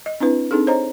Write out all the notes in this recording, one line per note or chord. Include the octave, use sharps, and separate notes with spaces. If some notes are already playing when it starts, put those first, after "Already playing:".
D#5
C4 D4 E4 B4
C4 D4 D#4 G#4 A4
C5 C#5 D#5 A#5